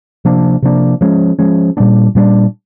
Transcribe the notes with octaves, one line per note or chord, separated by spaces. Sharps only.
C3 F3 A#3 D4
C3 F3 A#3 D4
F3 G#3 C#4
F3 G#3 C#4
A#2 G3 B3 D4
A#2 G3 B3 D4